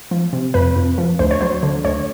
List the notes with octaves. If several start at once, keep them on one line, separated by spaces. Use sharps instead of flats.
F3
C3
F2 B4
F2
F3
D2 C5
C#5
F#3 C5
D3
D2 C#5